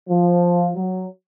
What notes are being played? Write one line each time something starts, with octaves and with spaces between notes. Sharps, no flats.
F3
F#3